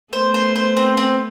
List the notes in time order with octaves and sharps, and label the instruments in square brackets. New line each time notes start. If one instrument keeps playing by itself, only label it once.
[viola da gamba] A3 B3 [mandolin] C5
[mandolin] C5
C5
C4
C4